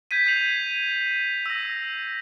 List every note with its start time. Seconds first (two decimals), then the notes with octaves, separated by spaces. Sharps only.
0.11 G6 G#6 B6 D#7
0.27 G6 C7 F7 F#7
1.46 E6 A#6